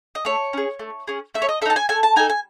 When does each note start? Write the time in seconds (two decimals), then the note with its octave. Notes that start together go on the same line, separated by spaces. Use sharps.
0.15 D#5
0.25 A3 C#5
0.53 C#4 G#4
0.79 A3
1.07 C#4 G#4
1.34 A3 E5
1.42 C#5
1.49 D#5
1.62 A4 E5
1.66 D#4 A5
1.76 G#5
1.89 A3 G#5
2.03 A5
2.16 D#4 A4 G#5
2.30 G#5